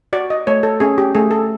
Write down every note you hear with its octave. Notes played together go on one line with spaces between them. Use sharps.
F#4 D5
D#5
A3 C#5
A4
C#4 G#4
G4
A3 G#4
A4